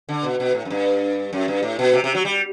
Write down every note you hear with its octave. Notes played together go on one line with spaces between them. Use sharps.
D3
B2
B2
A2
F#2
G2
F#2
G2
A2
B2
C3
C3
F#3
G3